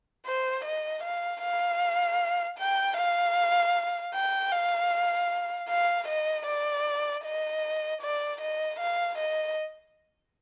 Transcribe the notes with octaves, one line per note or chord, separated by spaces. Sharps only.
C5
D#5
F5
F5
G5
F5
G5
F5
F5
D#5
D5
D#5
D5
D#5
F5
D#5